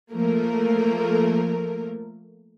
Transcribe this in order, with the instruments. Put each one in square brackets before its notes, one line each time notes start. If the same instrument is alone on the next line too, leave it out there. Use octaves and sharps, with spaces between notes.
[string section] F3 A3 A#3 A#4